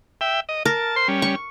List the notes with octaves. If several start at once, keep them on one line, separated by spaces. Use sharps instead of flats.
E5 G5
D#5
A#4 A5
C5 C6
G3 C#4
C#6